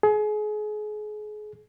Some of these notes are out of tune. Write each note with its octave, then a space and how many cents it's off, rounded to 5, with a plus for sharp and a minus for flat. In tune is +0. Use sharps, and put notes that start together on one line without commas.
G#4 +30